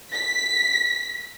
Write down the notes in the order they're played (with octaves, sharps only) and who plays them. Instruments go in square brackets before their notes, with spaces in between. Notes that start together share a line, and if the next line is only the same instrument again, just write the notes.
[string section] B6